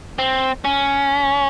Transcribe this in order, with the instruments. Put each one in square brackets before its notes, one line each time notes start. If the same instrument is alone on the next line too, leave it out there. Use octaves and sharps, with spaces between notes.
[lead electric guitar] C4
C#4